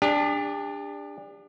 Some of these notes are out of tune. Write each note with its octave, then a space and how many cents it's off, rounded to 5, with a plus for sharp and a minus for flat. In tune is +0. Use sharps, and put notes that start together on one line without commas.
D4 +0 G4 +45